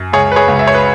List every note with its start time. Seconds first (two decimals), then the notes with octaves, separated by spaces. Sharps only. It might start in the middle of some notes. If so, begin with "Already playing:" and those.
Already playing: F#2
0.13 C#2 G#4 C#5
0.32 B4
0.36 G#4 C#5
0.48 C#2
0.59 E5
0.67 C#5
0.75 B4